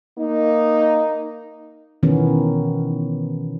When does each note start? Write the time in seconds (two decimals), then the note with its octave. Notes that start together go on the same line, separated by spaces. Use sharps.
0.18 A#3 D#4
2.03 B2 D#3 E3 B3 C#4